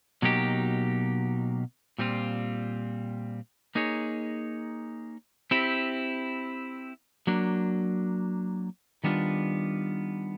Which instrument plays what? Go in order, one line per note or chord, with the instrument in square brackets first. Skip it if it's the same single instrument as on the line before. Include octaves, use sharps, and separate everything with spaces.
[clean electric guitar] B2 F#3 A#3 D#4 G4
A#2 G3 C4 F4
A#3 D#4 G#4 C#5
C4 E4 G4
F#3 A#3 D4
D#3 G3 B3 D4 F4